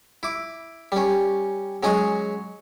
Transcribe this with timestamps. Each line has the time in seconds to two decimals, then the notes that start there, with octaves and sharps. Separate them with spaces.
0.23 E4 D6
0.92 G3 C#4
1.83 F#3 G#3 C#4 F#4 D#5